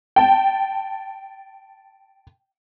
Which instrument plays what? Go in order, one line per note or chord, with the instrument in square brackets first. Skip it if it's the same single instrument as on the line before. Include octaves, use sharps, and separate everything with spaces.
[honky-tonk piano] G5 A5